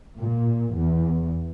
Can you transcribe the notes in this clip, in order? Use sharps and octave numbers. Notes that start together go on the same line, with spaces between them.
A#2
E2